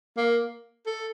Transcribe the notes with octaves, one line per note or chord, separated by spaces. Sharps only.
A#3
A4